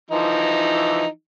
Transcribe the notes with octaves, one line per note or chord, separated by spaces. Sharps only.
E3 F3 D#4